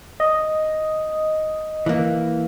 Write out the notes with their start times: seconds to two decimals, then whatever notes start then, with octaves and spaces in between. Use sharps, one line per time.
0.20 D#5
1.86 E3 A#3